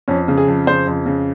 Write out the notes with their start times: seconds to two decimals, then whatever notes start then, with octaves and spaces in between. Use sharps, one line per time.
0.08 F2 C#4
0.28 C#3
0.38 G#4
0.48 F2
0.67 C#3 C5
0.87 F2
1.06 C#3